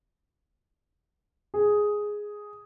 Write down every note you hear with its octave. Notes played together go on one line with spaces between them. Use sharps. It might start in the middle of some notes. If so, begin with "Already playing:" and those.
G#4